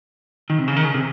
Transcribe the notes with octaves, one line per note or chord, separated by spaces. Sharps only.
D#3
C3
C#3
D#3
C#3
C3